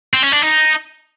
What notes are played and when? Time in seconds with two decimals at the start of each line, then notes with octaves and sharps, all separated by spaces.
0.14 C4
0.23 C#4
0.33 D4
0.43 D#4